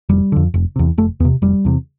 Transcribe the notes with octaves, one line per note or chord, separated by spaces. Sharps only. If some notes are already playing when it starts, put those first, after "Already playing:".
F1 G3
F2 D3
F1
E2 C3
F1 A3
E2 C3 B3
F1 G3
E2 C3